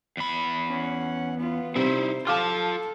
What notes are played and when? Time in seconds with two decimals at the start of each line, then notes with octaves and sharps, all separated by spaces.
0.17 E2 B5
0.68 C#4 F#5
1.38 B3 F4
1.76 C3 G3 D#4 E4 C5
2.27 F4 A4 F5 A5 D6 F6